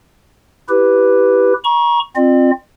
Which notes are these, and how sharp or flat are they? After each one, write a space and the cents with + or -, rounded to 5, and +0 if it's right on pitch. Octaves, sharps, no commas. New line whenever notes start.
E4 +0 G4 +0 B4 +0
A#5 +35 C#6 +0
C4 +10 F4 +0 D5 +45